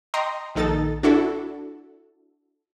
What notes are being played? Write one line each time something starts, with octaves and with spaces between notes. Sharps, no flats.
D#5 G5 A#5 C6
A#1 D#3 D#4 A4 A6
D4 E4 F#4 A4